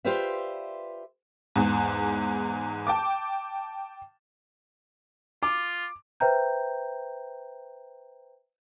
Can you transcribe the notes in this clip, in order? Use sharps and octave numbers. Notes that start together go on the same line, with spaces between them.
F4 G4 B4 C5 D5 E5
E2 G#2
G5 A5 D6
F4 D6
B4 C5 E5 G5 A#5 G6